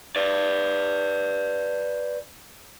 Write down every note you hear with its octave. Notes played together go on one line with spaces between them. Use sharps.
B4 D5